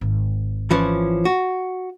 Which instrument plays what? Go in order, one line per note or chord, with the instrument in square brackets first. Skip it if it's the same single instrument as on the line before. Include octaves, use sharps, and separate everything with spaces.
[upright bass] G#1
[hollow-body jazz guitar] E3 F3 C#4
F#4